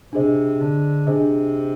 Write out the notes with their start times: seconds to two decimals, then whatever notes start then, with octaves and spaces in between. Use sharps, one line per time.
0.13 C3 D4 G#4 C5 D#5
0.61 D3
1.07 C3 D4 G#4 C5 D#5